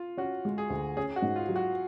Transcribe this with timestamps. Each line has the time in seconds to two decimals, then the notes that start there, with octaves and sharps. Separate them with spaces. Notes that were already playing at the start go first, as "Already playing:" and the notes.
Already playing: F4
0.18 C#4 F#4
0.45 G#3
0.58 G#4
0.70 D2
0.97 C#4 G#4
1.16 F#4
1.22 G#2
1.36 F4
1.49 F#3
1.56 F#4